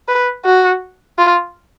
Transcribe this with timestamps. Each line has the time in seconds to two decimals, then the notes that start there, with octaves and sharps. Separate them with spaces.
0.08 B4
0.45 F#4
1.18 F4